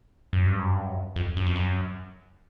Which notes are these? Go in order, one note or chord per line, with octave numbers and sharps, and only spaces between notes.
F#2
G2
F#2
G2
F#2
F2
F#2
F2
F#2